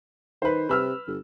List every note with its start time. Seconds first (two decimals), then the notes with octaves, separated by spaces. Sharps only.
0.42 D#3 B4 C5
0.69 C3 B4 E6 F6
1.07 G1